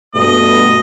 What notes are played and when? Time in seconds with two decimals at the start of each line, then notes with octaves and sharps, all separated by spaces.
0.15 G2 B2 A3 D#5